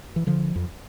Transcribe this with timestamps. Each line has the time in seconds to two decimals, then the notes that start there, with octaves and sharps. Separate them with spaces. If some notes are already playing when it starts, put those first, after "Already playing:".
0.16 E3
0.27 D3 F3
0.56 F2